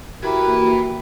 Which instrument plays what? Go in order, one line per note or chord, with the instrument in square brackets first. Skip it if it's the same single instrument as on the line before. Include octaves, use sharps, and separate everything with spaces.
[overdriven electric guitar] E3 B5 [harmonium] E4 G4 A#4 [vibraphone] F#4 E5
[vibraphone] A#3 F#4